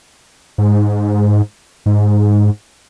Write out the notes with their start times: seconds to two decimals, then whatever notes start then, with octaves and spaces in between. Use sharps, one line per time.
0.58 G#2
1.86 G#2